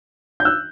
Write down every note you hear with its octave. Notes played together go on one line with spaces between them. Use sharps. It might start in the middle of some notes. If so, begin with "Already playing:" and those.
G6
E6 F#6